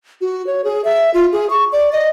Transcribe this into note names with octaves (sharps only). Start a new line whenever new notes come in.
F#4
C#5
G#4
E5
F4
G#4
C#6
D5
D#5